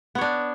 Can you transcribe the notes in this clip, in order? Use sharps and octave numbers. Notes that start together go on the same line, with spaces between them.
B3 D4 C#5